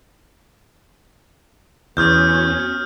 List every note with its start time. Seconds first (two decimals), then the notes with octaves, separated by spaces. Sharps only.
1.97 E2 B3 C#4 F#4 D#6 F6 G6